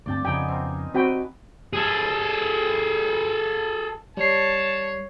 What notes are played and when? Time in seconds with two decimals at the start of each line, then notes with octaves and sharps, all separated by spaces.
0.06 D2 G2 C4 D5 G5 A5
0.25 F2 C#3 B3 D#4 G5 G#5
0.48 C4 A#4
0.94 C4 F#4 B4 G5
1.73 G#4 A4
4.17 G3 C#5 A5 C7